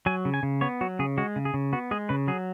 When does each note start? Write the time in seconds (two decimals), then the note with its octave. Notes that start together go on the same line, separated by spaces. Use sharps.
0.06 F#3 G#5
0.25 C#3
0.34 G#5
0.43 C#3
0.61 B3 C#5
0.81 F#3 F#4
0.99 C#3 G#4
1.18 G#3 F#4
1.36 C#3
1.45 G#4
1.54 C#3
1.73 B3 F#4
1.91 G#3 G#4
2.09 C#3 B4
2.28 F#3 G#4